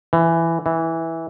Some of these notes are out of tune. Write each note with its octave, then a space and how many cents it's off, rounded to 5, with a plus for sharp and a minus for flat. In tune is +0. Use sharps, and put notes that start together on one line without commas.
E3 +10
E3 -10